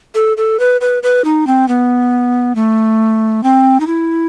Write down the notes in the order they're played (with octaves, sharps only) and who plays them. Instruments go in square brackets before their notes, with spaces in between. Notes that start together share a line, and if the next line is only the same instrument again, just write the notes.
[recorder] A4
A4
B4
B4
B4
D#4
C4
B3
A3
C4
D#4
E4